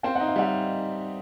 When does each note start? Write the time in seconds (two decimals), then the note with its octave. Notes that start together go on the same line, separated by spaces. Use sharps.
0.03 C4 F5 G5
0.15 E5 F#5
0.20 D#4
0.27 D#5 F5
0.36 G3 E5 F#5